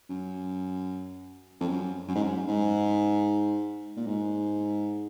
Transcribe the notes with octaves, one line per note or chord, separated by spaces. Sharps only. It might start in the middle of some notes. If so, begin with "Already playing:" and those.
F#2
F2
F#2
F#2
G#2
F#2
G#2
A#2
G#2